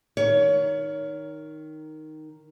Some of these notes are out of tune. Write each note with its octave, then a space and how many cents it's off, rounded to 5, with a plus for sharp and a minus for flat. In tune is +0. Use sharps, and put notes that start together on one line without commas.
D#3 +0 C#5 +25